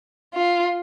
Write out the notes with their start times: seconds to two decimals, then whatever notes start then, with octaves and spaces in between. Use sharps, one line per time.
0.35 F4